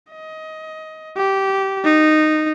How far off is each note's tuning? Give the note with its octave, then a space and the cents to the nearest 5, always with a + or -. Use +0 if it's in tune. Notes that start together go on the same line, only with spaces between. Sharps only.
D#5 +20
G4 -15
D#4 -15